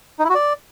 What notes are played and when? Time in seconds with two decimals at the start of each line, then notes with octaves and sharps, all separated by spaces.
0.19 D#4
0.24 E4
0.30 F#4
0.35 D5